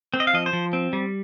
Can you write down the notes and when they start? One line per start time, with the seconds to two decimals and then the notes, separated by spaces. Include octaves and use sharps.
0.14 C4
0.20 D#5
0.27 F5
0.33 F3 D#5
0.46 C5
0.53 F3
0.73 C4
0.93 G3